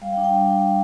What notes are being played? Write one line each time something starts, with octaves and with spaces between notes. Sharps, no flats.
G3 F5
G5
D4
G5